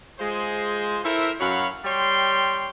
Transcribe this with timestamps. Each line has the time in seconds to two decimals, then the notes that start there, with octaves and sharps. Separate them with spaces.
0.18 G#3 F4 G#4 C5
1.03 E4 A4 A#4 C5 E5
1.39 F#2 F#4 C#5 F5 B5
1.84 G3 C#5 G5 C6